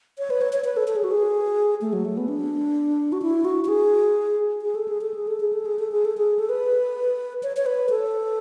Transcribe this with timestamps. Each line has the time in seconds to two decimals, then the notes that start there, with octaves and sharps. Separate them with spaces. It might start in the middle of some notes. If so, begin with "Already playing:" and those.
0.18 C#5
0.30 B4
0.41 C#5
0.53 C#5
0.64 B4
0.77 A4
0.88 A4
0.96 G#4
1.04 F#4
1.11 G#4
1.81 A3
1.93 F#3
2.05 A3
2.17 B3
2.28 D4
3.12 F#4
3.22 E4
3.45 F#4
3.64 F#4
3.68 G#4
4.62 G#4
4.75 A4
4.88 G#4
5.01 A4
5.14 G#4
5.27 A4
5.40 G#4
5.53 A4
5.65 G#4
5.79 A4
5.92 G#4
6.05 A4
6.18 G#4
6.39 A4
6.49 B4
7.43 C#5
7.57 C#5
7.66 B4
7.90 A4